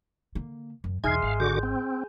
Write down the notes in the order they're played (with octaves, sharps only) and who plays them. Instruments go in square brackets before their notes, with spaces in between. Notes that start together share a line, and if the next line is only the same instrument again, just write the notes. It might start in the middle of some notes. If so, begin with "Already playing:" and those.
[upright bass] D3 A#3
F#2
[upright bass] B1 E2 [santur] G#3 [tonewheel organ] D#4 G#6 [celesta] E5 F6 C7
[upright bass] G#1 [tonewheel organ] F5
[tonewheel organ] D3 F#4 D6 [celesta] G6
[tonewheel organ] C4